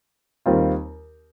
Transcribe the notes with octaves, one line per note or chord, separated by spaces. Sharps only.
D#2 D#3 G3 C4 F4